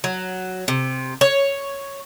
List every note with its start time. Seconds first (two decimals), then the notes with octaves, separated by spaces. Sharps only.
0.04 F#3
0.68 C3
1.21 C#5